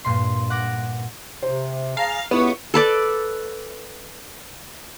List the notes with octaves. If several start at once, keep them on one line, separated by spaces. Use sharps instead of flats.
G2 A#2 C6
F#5 D6 A#6
C3 C5
G#4 F5 A5 A#5
C#2 B3 E4 G4 B4 C#6
A4 B4 D5